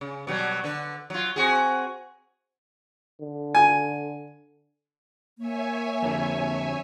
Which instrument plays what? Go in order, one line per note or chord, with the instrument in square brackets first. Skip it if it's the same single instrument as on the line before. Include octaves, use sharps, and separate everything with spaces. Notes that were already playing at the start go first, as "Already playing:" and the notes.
[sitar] C#3
B2 F#3 G3
D3 B4
F#3 F4
C4 F#4 G#4
[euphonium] D3
[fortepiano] G#5
[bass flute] A#3 [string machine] C#5 E5 G#5
[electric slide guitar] F2 D3